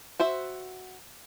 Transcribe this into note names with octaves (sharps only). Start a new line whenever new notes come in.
F#4 C5 E5